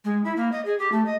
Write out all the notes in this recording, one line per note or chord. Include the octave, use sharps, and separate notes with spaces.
G#3
E4
A#3
D#5
G#4
G4
A3
D#5